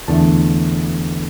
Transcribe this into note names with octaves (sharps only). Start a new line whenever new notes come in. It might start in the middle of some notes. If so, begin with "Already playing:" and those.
E2 D3 A3 A5